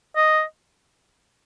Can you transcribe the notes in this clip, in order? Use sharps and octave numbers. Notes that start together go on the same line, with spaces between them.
D#5